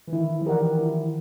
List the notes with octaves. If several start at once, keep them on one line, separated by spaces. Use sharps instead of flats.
E3
D#3 E4
F3
E3 G4 A#4 D5 F#5
E3
F3 E4